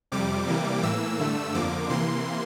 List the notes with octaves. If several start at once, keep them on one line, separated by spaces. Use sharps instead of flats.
F2 C3 G3 D6
C3 E3 G3 A#3
A2 E3 A#3 E6
G2 D3 A3
F2 D3 F3 A#3 D6
C3 E3 A#3 C6